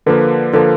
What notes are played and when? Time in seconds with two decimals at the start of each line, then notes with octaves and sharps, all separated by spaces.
0.06 D3 F3 A#3 A4 B4
0.53 D3 F3 A#3 A4 B4